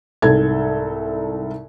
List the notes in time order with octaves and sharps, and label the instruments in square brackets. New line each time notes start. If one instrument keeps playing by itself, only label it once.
[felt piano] C2 G#2 A4 G#6